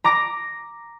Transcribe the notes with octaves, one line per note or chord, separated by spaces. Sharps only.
A#5 D6 A#6